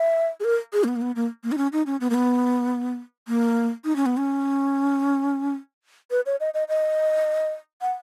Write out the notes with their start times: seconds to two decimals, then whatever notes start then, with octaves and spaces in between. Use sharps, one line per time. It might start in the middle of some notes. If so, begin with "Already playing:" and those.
Already playing: E5
0.40 G#4
0.44 A#4
0.73 G#4
0.84 A#3
0.88 B3
0.96 A#3
1.01 B3
1.15 A#3
1.44 A#3
1.52 D#4
1.58 C#4
1.72 D#4
1.86 C#4
2.00 B3
2.10 A#3
2.14 B3
3.28 A#3
3.84 D#4
3.96 C#4
4.06 B3
4.17 C#4
6.11 B4
6.26 C#5
6.40 D#5
6.54 D#5
6.69 D#5
7.81 F#5